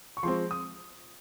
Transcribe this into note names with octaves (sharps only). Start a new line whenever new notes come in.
C#6
F3 G#3 C4 C6
D#6